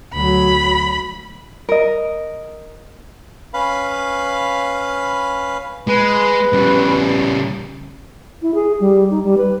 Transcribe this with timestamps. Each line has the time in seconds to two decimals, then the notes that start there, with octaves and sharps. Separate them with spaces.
0.14 D2 F#3 B5
1.69 A#4 D#5
3.54 C#4 B4 F5 B5
5.88 G#3 B4
6.54 C#3 G3
8.42 E4
8.54 G#4
8.80 G3
9.11 D#4
9.24 G3
9.38 B4